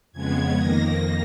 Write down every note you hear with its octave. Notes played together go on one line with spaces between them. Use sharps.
F2 C#3 G#3 B3 G#6
F2 D#3 A#3 A#6